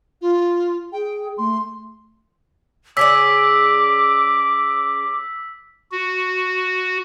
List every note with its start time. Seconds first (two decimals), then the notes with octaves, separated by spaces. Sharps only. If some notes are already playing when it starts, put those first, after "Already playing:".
0.21 F4
0.92 G#4 G5
1.38 A3 C6
2.97 C#3 G#4 D5 D6 E6 B6
5.92 F#4